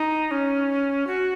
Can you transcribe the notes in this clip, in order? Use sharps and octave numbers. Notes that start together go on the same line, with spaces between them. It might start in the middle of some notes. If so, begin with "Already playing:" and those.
Already playing: D#4
C#4
F#4